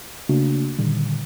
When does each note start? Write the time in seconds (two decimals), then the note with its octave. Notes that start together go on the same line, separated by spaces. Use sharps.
0.29 C#3 A3 A#3 D4 F#4
0.79 A#2 D3 D#3 G3